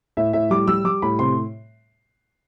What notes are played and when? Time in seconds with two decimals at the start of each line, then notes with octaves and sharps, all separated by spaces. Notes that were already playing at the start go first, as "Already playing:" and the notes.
0.17 A2 E5
0.33 A2 E5
0.50 G3 D6
0.68 G3 E6
0.85 G3 D6
1.02 A2 B5
1.19 C3 C6